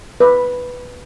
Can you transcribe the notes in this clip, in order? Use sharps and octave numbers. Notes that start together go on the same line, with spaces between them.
B4